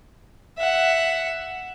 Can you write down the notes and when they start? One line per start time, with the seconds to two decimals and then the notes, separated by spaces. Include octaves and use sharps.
0.58 E5 F#5